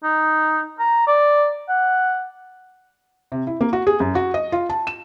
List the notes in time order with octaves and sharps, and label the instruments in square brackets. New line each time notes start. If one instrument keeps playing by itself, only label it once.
[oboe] D#4
A#5
D5
F#5
[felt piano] C3
E4
A#3
F#4
G#4
F#2
F#4
D#5
F4
A5
E7